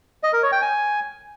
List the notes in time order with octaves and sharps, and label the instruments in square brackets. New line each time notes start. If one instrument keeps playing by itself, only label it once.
[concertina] D#5
A#4
C#5
G5
G#5